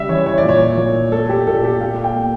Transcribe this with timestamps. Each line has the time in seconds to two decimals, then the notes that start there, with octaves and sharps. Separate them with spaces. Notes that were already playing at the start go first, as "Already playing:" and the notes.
Already playing: C#3 G3 E5
0.09 E3 C#5
0.26 C#5
0.38 D5
0.43 A#2
0.49 C#5
0.77 A#2
1.12 A3 A4
1.29 G4
1.47 A#2 A4
1.64 G4
1.81 A#3 F5
2.04 G5
2.15 A#3